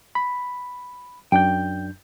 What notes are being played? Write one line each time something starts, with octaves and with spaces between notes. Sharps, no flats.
B5
F#2 D4 G5 G6